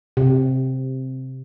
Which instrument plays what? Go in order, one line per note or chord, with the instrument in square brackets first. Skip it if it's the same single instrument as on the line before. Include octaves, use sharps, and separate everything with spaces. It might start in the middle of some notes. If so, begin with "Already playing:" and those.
[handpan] C3